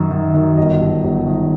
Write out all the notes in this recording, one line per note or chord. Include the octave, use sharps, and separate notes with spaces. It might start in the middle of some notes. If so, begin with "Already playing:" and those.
Already playing: F#2 D#3
D#3
D#3
G1 D#5
G2
G1
D#3